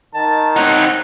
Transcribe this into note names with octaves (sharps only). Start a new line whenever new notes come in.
D#3 A5
C4 D#4 C#5 F#5